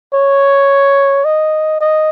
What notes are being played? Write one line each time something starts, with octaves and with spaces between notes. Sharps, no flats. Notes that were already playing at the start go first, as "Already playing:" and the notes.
C#5
D#5
D#5